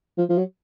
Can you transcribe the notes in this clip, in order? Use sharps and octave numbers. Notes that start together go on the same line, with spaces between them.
F3
F3
F#3